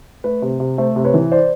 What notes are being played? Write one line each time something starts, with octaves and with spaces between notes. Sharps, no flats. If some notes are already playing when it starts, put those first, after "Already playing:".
A3 B4
C3
C3
A3 C5
C3
B4 C#5
E3
C5 D5